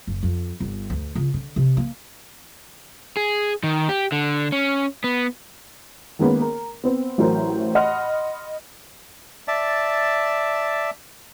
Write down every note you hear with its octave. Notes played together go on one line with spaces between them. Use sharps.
F#1
F2
G1
D2
C#2
D3
C3
A#3
G#4
D#3
G4
D3
C#4
B3
D#3 G#3 A#3 B3 C#4
A#4
B3 C4
A1 A2 F#3 A#4 C5
D#5 F#5 B5 C6 F6
D5 E5 A5